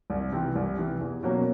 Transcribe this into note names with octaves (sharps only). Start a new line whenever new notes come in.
C2
C3 E3
C2
C3 E3
E2
B2 F#3 A#3 C#4